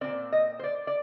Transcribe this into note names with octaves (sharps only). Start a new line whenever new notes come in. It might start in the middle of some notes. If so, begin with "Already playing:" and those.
A#2 G#3 C4 D5
D#5
C5
D5
D5